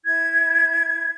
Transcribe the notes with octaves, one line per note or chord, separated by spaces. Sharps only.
E4 G#6